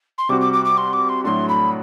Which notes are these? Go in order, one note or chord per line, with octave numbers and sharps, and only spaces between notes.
C6
C3 G3 C4 F#4 D6
D6
D6
D6
C6
D6
C6
A2 F#3 A3 D4 F#4 C6
B5